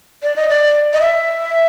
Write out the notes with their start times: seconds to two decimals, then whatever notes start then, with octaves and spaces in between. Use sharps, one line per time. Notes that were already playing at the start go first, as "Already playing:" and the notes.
0.23 D5
0.36 D#5
0.49 D5
0.93 D#5
1.00 E5